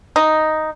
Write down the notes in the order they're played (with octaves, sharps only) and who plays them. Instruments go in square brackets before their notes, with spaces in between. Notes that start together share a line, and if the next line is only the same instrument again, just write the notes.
[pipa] D#4